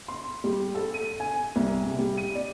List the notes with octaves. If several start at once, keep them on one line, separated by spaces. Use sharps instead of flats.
C6
G3
A4
D#7
G#5
C2
C3
G3
D#7
D5